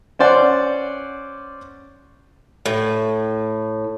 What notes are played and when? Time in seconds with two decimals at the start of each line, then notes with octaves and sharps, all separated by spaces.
0.19 C#4 C5 D5 F#5
2.66 A2